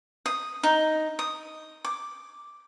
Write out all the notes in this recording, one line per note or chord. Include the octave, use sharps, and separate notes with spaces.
D#6
D#4
D#6
D6